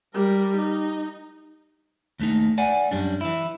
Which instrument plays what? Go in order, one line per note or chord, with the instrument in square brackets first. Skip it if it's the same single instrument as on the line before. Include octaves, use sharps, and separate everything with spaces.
[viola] G3 A#4
D#4
[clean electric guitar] D#2 A3 D#4
D5 F#5 G#5
F#2 G3 D4
E3 E4